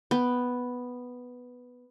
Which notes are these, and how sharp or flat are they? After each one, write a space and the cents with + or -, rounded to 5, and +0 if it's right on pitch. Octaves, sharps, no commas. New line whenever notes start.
B3 +0 G5 +0